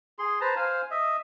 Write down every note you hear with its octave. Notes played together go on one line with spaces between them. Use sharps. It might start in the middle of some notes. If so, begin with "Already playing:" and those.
G#4 C6
B4 C5 A5 A#5
C5 F5 G#5
D#5 E5